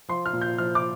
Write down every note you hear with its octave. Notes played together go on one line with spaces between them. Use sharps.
F3 C6
F6
A#2
G6
F3 F6
D6